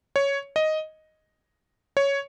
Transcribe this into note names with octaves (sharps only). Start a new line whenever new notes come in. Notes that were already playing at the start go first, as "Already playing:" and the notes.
C#5
D#5
C#5